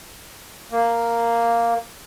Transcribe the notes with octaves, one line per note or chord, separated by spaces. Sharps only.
A#3